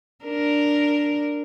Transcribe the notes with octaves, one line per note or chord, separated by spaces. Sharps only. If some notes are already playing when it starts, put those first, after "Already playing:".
D4 A#4